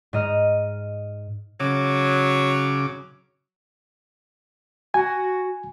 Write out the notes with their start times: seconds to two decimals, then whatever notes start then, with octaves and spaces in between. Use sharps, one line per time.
0.13 G#2 D#5 F6
1.60 C#3 F#3 D6
4.94 F#4 G#5